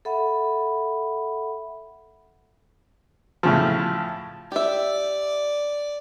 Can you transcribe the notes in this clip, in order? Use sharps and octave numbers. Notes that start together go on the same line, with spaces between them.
A4 E5 F#5 B5
A2 C#3 F3
G4 D5 E5